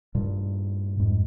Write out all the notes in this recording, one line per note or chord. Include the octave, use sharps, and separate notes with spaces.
G2 A#2
F2 G#2